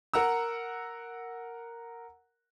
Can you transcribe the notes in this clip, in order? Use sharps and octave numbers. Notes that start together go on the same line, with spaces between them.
A#4 F#5 A#5 E6